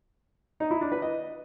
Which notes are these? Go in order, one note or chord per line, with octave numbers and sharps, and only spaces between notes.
D#4
E4
D4
B4
D#5